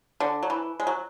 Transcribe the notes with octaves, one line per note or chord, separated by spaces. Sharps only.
D3
F#3
E3
G#3
F#3